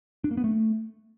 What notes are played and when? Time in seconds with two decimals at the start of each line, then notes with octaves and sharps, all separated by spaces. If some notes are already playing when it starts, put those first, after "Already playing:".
0.24 D4
0.31 A#3
0.37 B3
0.44 A3